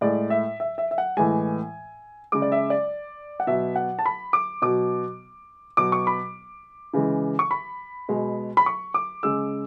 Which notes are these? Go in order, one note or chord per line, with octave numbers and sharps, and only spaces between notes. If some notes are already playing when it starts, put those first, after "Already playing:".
A2 G#3 D5
E5
E5
E5
E5
F#5
A2 E3 G#3 G#5
C#3 G#3 D6
D5
E5
D5
F#5
B2 F#3 E5
F#5
A5
B5
D6
B2 F#3 D6
B2 F#3 D6
C#6
B5
C#3 E3 G#3
C#6
B5
B2 G#3
B5
C#6
D6
C#3 G#3 E6